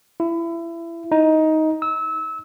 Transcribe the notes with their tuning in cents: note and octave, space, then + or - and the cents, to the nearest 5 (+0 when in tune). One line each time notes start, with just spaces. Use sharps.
E4 +25
D#4 +15
E6 -25